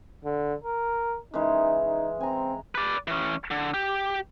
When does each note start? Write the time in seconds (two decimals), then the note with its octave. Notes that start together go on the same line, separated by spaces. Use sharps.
0.25 D3
0.64 A#4
1.34 C#3 E3 G#3 D#4
1.85 D#4
2.20 C4 G#5 A#5
2.75 B4 D5
3.07 E3 C#4
3.51 D3
3.74 G4